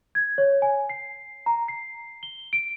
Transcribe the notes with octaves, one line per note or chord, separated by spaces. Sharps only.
G#6
C#5
G#5
C7
A#5
C7
G7
D7